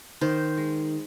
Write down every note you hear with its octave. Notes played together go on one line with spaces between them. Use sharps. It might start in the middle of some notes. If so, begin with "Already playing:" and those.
D#3 C5
G#3